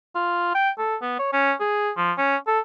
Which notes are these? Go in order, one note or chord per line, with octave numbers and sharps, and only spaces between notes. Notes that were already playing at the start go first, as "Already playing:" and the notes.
F4
G5
A4
B3
C#5
C#4
G#4
F3
C#4
A4